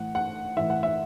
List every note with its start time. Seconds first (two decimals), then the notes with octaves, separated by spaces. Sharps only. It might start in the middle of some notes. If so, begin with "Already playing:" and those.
Already playing: A2 E3 F#5
0.15 F#5
0.57 A2 E3 E5
0.70 F#5
0.83 E5